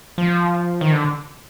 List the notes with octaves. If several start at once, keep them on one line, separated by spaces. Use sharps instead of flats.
F3
D#3
D3